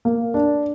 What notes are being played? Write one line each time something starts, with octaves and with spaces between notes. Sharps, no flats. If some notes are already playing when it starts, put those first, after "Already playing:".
A#3
D4